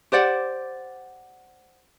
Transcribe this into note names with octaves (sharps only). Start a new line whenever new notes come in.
G4 C5 D5 F#5